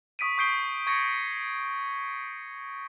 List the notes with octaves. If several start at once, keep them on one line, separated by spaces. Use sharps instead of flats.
C#6 D#6 B6 D7 D#7
C#6 D#6 G6 C7 D7 G7
C#6 G#6 A#6 C#7